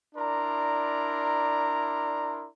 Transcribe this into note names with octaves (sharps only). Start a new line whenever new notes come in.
D4 E4 A#4 D5 A#5 C6